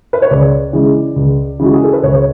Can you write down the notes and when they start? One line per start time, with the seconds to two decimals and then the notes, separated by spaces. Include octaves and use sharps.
0.13 B4
0.22 C#5
0.30 C#2 D5
0.73 C#3 E3 G#3
1.16 C#2
1.59 C#3 E3 G#3 F#4
1.74 G#4
1.83 A4
1.93 B4
2.03 C#2 C#5
2.14 C#5